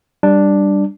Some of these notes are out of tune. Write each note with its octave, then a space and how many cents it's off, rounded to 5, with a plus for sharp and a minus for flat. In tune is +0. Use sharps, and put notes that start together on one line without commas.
G3 +0 D4 +0